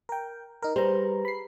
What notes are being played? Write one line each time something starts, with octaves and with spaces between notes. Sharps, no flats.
A#4 G5
D#4 A#4
G3 G4 G#4 B4 C5 A#5
B5 C7